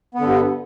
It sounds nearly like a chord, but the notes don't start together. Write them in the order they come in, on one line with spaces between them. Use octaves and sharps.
B3 D3 G2